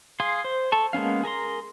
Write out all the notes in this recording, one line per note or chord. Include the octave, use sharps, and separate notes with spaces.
G#4 F5 C6
C5
A4 A5 C#6
G#3 A#3 B3 C#4 F5
G#4 A#4 A#5 C6